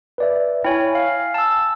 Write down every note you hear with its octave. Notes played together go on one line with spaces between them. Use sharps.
B4 D5 E5
E4 C#5 G5 G#5
F5
A5 E6